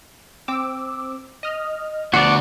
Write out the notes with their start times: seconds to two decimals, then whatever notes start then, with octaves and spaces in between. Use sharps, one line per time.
0.48 C4 D6 E6
1.43 D#5 F6
2.14 D2 B3 F#4 D5